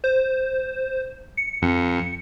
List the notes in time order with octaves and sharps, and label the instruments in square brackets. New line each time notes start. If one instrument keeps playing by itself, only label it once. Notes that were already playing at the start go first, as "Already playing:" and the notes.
[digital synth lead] C5
C#7
[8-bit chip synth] F2